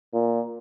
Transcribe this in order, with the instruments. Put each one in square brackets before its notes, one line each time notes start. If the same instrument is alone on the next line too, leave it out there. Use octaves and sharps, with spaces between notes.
[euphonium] A#2